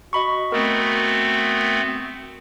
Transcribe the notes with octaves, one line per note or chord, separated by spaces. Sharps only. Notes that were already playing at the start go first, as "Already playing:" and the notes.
F#4 D#5 B5 C#6
A3 B3 C4 A#4